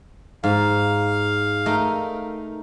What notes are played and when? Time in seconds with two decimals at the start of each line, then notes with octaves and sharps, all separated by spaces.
0.44 G#2 F5
1.66 A3 D#4 A#4